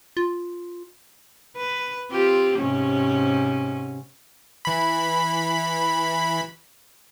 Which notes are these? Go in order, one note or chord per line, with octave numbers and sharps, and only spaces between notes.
F4
B4
C4 F4 G4
G#2 C3 C#4
E3 B5